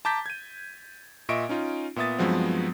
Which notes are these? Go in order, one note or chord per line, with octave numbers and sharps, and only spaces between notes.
A5 A#5 D6 G6 A6 B6
G#6 D#7
A#2 D#5 E5 C#6 D7
C#4 D#4 F4
A#2 B3 E5 D#6 A6
G2 F3 F#3 G#3 B3 C4